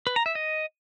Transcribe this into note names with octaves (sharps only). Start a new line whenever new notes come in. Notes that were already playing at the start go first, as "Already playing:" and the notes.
B4
A#5
E5
D#5